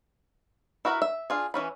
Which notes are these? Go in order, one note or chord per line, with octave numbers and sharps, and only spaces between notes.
E4 F#4 A#4 B5
E5
D4 F4 G#4
E3 F3 C#4 B5